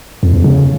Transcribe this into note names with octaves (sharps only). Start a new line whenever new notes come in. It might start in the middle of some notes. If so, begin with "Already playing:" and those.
F2
E2
C#3